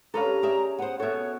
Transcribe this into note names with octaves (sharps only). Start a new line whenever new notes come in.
G2 C#4 A4 B4 F5 A#5
G4 G#4 D5 E5
B3 C5 F#5
B2 F#4 A4 C#5 E5